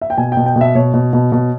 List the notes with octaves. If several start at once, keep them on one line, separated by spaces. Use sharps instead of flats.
E5
G5
B2 G#5
B2 G5
G5
B2
E5
B2 C#5
B2
B2
B2